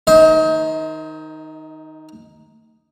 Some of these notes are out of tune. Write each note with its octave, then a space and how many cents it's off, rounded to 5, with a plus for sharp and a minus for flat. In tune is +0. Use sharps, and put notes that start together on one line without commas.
D#3 +0 C5 +0 D#5 +35